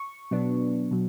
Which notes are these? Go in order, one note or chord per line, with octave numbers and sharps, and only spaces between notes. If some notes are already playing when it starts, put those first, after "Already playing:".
Already playing: C#6
B2 F#3 B3 D4
B2 F#3